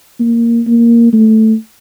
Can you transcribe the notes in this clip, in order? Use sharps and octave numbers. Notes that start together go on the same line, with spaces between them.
A#3
A#3
A3